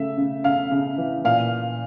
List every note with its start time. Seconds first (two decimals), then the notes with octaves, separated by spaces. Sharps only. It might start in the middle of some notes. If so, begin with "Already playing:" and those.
Already playing: C#3 A3 E5
0.17 C#3
0.44 C#3 F5
0.71 C#3
0.98 E3
1.24 A#2 F5